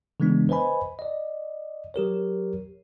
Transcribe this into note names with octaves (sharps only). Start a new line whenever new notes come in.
C#3 E3 G#3 B3 D4
B4 C5 D#5 G#5 B5
D5 D#5
F#3 G4 A#4 C#5